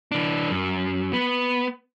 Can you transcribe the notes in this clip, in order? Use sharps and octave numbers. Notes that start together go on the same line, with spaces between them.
E3 D4
F#2
B3